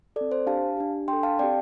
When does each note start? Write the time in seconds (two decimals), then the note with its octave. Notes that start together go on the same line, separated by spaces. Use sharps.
0.16 C4 A4 D5
0.32 C5
0.47 D4 G4 F5 A5
0.77 D4 G4
1.08 D4 G5 C6
1.13 A4
1.23 F5 A5
1.39 C4 G4 D5 G5